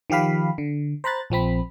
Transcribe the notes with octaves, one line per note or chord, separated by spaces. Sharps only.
D#3 F3 G4 F5 B5
D3
C5 A#5 B5 F#6 A6
A#1 F3 C4 B5